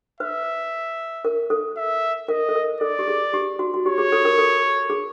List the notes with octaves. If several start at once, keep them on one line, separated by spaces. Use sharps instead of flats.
B4 E5
A#4
A4
E5
A#4 D#5
A4
A#4
A4 D5
G4
G#4
G4
F#4
F#4
G4 C#5
G#4
A4
A#4
A4
G#4